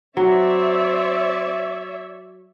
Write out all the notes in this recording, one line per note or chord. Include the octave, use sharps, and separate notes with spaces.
F#3 C4 C#5 D5 E5